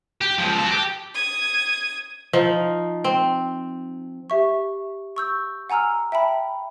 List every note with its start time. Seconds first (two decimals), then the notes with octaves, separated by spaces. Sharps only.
0.21 G4
0.38 C#2 F3
0.59 F#4 A4
0.70 G4
1.14 D#6 G#6
2.33 F3 D#4
3.04 C4
4.30 G4 E5 C#6
5.16 C#6 E6 G6
5.70 F#5 G#5 A#5 E6 F6
6.12 E5 G5 A5 B5